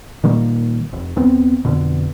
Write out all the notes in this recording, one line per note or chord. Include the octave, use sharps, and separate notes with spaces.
A#2 D#3 G3 A#3
F1
D#2 B3 C4
F2 B2 D3